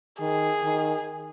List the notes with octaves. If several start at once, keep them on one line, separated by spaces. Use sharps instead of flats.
D#3 G#4
D#3